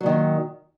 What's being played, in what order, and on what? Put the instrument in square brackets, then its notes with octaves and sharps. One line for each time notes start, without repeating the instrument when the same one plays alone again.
[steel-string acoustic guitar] F#3
A#2
D#3